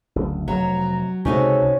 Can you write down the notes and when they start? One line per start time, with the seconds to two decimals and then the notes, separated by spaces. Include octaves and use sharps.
0.16 F#1 D2
0.48 F1 F#3 A#5
1.25 C#2 C3 G#3 C#4 D#4 F#4 A4